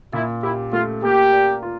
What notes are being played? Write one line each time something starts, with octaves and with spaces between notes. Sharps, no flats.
A#2 E4
E4 G4
A3 F4
A#3 G4
D5
F4